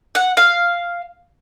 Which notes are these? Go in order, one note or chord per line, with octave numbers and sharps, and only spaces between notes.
F#5
F5